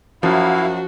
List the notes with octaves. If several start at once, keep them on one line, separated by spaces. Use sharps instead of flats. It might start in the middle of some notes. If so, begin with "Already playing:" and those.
F#2 F3 E4 F#4 F5